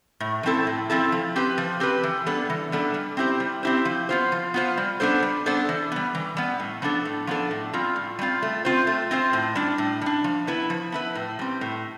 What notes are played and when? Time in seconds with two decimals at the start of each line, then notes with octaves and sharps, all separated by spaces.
0.20 A2
0.43 F3 C4 E4 A4
0.67 A2
0.90 F3 C4 E4 A4
1.12 F3
1.36 C4 G4 B4
1.58 F3
1.80 C4 G4 B4
2.03 E3
2.26 G3 B3 D4 A4
2.50 E3
2.72 G3 B3 D4 A4
2.94 G3
3.17 C4 E4 G4 C5
3.40 G3
3.63 C4 E4 G4 C5
3.85 F3
4.09 B3 F4 C5
4.32 F3
4.54 B3 F4 C5
4.77 G3
5.00 B3 D4 A4 C5
5.23 G3
5.46 B3 D4 A4 C5
5.69 E3
5.92 G3 B3
6.15 E3
6.37 G3 B3
6.59 A2
6.82 F3 B3 D4 A4
7.05 A2
7.27 F3 B3 D4 A4
7.51 A2
7.73 G3 C4 F4
7.96 A2
8.19 G3 C4 F4
8.42 A3
8.65 C4 F4 C5
8.87 A3
9.11 C4 F4 C5
9.33 A2
9.55 G3 D4
9.78 A2
10.01 G3 D4
10.24 F3
10.47 B3 E4 B4
10.70 F3
10.92 B3 E4 B4
11.15 A2
11.39 G3 C4
11.61 A2